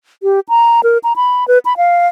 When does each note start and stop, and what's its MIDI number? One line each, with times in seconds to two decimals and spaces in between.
0.23 0.40 67
0.49 0.81 82
0.83 0.98 70
1.04 1.13 82
1.16 1.47 83
1.48 1.58 71
1.65 1.77 83
1.77 2.07 77